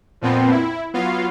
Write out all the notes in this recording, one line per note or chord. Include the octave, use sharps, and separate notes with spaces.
F2 A#2 F3 B3 C4
E4
F#3 B3 F4 F5